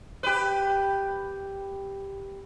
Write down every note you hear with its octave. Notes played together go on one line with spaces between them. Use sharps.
G4 B4